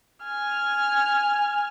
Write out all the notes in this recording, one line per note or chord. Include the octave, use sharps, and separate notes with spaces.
G#5 F6